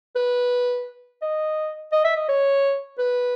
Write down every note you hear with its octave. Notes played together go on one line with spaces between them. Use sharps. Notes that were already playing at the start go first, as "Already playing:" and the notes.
B4
D#5
D#5
E5
D#5
C#5
B4